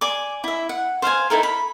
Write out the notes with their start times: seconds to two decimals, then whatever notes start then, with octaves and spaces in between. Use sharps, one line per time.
0.01 D5 G#5 D6
0.44 E4 E5
0.69 F#5
1.02 C5 F5 G5 G#5
1.30 D#4 E4 A4 A#4
1.43 B5